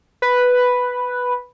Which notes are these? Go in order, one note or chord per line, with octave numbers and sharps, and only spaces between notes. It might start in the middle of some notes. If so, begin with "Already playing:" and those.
B4